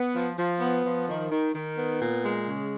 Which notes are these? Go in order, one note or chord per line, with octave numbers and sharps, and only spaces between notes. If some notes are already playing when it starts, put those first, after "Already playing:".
Already playing: B3
F3
F3
B3
F3
D#3
D#3
D#3
B3
A#2
G#3
C#3